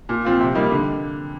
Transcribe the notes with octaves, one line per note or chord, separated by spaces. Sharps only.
A#2
F3 C4 F4
C3
G3 A#3 D#4
D3